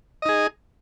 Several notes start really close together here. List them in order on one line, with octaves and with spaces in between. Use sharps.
D#5 D#4 G#4